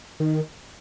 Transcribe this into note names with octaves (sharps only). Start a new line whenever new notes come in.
D#3